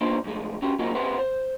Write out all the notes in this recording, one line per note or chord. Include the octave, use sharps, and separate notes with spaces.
A#3 B3 D4 D#4 F4 C5
C2 F2 A2 G#3
C#4 F#4 G4
F#3 A#3 C4 D#4 F4 F#4
C4 G4 B4 C5 E5 F#5
C5